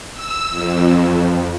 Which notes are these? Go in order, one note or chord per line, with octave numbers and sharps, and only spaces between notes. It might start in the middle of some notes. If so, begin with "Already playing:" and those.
E6
F2